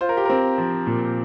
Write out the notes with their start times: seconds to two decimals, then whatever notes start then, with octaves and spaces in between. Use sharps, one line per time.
0.01 F4 C5
0.09 A#4
0.17 G4
0.25 C4 A#4
0.58 F3
0.87 A#2